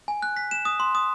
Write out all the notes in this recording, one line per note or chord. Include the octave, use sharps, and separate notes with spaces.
G#5
F#6
B6
E7
D#6
C6
D#6